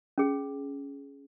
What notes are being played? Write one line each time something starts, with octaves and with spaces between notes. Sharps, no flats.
C#4 G#4